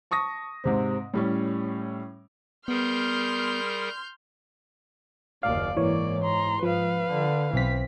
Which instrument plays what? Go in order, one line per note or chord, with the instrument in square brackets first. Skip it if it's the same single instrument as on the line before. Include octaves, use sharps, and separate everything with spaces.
[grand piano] A5 C#6 D#6 A#6
G#2 C3 C4
A2 G3 C#4
[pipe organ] G3 G#4 A#4 [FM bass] B3 [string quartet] C6 F6 G6
[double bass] F#1 D#2 [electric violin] D5 [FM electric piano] F5
[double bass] G#2 [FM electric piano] E3 C#5 [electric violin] A#3 D5
[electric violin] A#5 C6
[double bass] G#2 [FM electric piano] F3 [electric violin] B4 F5
[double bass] D3
[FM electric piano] B1 B6 [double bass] E3 C4